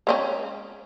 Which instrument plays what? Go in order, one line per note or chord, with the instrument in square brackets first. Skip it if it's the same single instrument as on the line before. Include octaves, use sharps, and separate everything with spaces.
[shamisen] G#3 C4 C#4